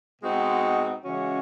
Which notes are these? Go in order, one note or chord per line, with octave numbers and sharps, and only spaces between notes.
B2 G#3 C4 D#4 F#4
C#3 E3 G#3 C#4 F#4